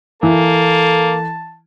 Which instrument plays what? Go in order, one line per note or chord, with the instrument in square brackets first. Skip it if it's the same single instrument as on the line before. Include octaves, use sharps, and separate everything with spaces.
[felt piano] E3 [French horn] A#3 [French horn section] A4 [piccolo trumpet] A5